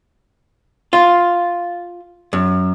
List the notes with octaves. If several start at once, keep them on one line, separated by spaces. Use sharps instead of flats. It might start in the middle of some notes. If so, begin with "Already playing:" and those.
F4
F#2